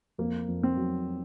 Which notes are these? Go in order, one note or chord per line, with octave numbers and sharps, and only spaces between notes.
F2 A#3
F2
C4
F#3